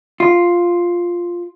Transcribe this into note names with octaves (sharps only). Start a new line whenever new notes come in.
F4